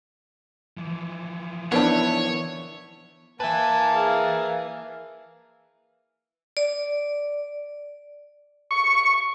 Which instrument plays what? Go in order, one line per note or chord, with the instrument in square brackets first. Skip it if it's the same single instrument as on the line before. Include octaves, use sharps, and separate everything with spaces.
[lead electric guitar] E3 F3
[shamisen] D#3 C4 D4 [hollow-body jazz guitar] B3 E4 [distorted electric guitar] C#5
[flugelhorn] A#3 [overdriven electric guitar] B4 E5 [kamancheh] G#5 [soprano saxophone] A5
[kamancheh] G#4 F5
[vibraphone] D5
[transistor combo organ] C#6